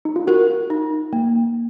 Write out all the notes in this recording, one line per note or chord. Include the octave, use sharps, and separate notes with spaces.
D#4
F4
F#4 A#4
D#4
A#3